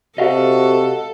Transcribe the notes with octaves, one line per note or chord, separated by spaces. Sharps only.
C3 F#4 A4 D#5 F5 F#5